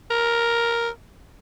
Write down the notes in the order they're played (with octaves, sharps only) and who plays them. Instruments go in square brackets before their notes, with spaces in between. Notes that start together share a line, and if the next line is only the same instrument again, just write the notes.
[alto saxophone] A#4